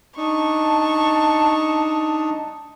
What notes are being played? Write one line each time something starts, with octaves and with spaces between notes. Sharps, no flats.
D4 D#4 A5 C#6